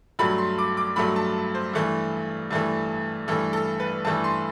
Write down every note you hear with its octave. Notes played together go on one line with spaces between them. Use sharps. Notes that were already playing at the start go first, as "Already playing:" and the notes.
G2 F#3 A3 B5
C6
D6
D6
G2 F#3 A3 B5
A5
C5
G2 E3 A3
G2 E3 A3
G2 E3 A3 A4
A4
B4
G2 E3 A3 A5
C6